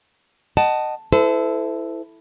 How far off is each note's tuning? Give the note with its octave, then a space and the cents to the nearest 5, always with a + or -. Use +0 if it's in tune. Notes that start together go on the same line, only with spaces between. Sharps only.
D#5 -15 F#5 +25 A5 +0
E4 +0 A4 -5 C5 -45